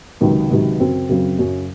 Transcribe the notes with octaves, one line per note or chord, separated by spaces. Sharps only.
C#2 C3 D#3 F#3
C#2 C3 D#3 F#3
F#2 C#3 F#3 C4
F#2 C#3 F#3 C4
F#2 C#3 F#3 C#4